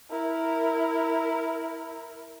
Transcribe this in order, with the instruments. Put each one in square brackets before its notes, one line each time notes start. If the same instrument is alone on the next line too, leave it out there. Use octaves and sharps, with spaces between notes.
[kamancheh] E4 A#4